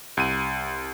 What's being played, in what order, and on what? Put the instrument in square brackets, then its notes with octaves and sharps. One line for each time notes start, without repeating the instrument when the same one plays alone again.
[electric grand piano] C2 D#7